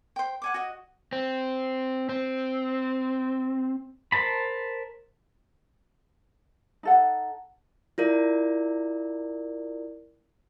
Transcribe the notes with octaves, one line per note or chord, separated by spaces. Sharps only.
C5 G5
F#5 G#5 D6
F#4 D#5
C4
C4
A#4 C5 A5 B5
D#4 A4 F#5
E4 F4 A#4 D5